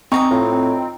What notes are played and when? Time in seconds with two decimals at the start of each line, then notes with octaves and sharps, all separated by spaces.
0.12 C4 D#4 G5 G#5 A#5 C#6 D#6
0.31 A2 F4